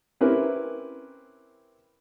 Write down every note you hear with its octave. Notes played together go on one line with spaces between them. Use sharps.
C4 C#4 E4 G4 A#4 B4